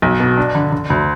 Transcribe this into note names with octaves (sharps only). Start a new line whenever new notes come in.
B1
B2
D4
D3
D3
D2